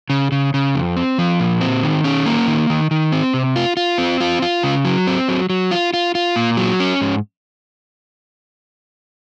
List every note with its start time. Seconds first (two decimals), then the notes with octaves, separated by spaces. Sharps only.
0.10 C#3
0.32 C#3
0.54 C#3
0.75 F2
0.97 C4
1.19 F3
1.40 A#2
1.61 C4
1.83 D#3
2.04 C#4
2.26 A#3
2.47 D#3
2.70 D#3
2.91 D#3
3.12 C4
3.34 C3
3.56 F4
3.77 F4
3.98 C4
4.21 F4
4.42 F4
4.63 C#3
4.85 F#3
5.07 C4
5.28 F#3
5.50 F#3
5.71 F4
5.94 F4
6.15 F4
6.36 A#2
6.57 F#3
6.80 C#4
7.01 G#2